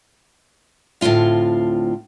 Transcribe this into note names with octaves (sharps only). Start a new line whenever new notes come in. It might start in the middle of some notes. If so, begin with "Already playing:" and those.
D2 A2 C4 F4 F5